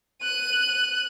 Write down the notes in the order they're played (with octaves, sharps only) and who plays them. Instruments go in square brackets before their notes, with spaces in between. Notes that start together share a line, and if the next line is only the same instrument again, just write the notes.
[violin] F#6 D#7